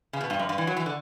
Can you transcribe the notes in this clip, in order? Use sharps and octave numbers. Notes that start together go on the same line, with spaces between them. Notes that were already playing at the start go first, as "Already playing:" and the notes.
C#3
B2
G2
F#2
G2
E3
F#3
E3
D3